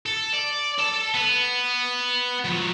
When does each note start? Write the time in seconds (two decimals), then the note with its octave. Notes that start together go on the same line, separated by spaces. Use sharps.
0.06 A4
0.33 D5
0.78 A4 A5
1.14 B3
2.45 F3 F#3